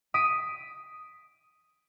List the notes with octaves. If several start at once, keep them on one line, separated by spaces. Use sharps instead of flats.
D#6 B6 D7